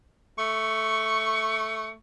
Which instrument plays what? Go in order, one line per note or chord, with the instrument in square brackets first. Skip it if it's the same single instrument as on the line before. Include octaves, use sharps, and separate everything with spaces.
[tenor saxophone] A3 [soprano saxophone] C#6